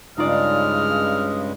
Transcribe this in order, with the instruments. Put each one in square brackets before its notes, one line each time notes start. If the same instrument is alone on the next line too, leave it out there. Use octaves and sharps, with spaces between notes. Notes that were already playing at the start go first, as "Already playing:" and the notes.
[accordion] G2 C#3 G#3 [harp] D#4 F4 D5 [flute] D#6 [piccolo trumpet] F6